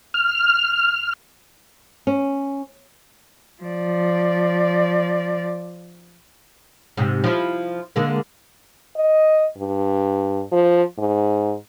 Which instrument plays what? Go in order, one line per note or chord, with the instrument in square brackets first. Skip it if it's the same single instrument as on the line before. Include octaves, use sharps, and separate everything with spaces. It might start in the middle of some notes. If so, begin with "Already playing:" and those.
[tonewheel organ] F6
[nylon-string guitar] C#4
[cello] F3 D5
[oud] G#2 C3
F3 E4
D3 G#3 A#3
[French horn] D#5
G2
F3
G#2